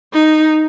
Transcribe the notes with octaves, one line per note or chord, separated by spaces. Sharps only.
D#4